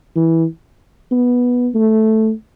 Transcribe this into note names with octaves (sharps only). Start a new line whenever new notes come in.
E3
B3
A3